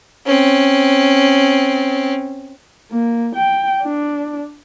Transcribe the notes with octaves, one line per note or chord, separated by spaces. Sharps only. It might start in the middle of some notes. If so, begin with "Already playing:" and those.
C4 C#4
A#3
G5
D4